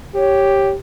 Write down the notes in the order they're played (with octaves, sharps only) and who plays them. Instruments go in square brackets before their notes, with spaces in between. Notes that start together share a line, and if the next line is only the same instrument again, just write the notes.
[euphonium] G4 [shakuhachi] C#5